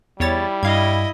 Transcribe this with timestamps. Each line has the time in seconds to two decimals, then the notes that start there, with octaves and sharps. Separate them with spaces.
0.20 E2 G3 E4 C#5 A6
0.63 G2 E4 D#5 F5 G#6